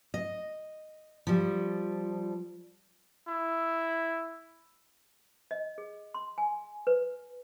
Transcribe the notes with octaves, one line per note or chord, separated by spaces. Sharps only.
D#5
F3 G3
E4
D#5
G#4
C6
G#5
B4